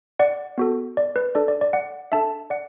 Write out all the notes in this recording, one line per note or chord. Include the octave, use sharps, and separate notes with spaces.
D5 F#5
B3 F#4 A4
D5
B4
D4 A4 D5
D5
D5
D5 F#5
D4 A4 E5 A5
D5 F#5